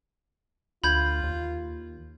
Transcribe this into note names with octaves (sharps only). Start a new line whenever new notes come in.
D2 F4 B5 G6 G#6
D#2